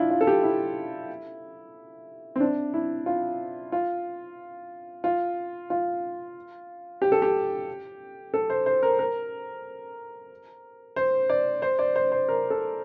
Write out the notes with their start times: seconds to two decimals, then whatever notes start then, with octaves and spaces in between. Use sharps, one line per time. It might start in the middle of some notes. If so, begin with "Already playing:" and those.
Already playing: D4 E4 F4
0.10 F4
0.21 A4
0.27 G4
0.43 E4
2.36 C4
2.40 D4
2.74 E4
3.06 F4
3.72 F4
5.04 F4
5.70 F4
7.02 G4
7.12 A4
7.22 G4
8.34 A4
8.50 C5
8.66 C5
8.83 A#4
8.99 A#4
10.96 C5
11.30 D5
11.62 C5
11.79 D5
11.96 C5
12.12 C5
12.29 A#4
12.50 A4